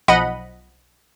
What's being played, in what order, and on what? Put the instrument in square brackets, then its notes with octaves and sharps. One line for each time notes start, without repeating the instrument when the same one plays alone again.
[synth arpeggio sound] B1 F3 D#5 F#5 B5 D#7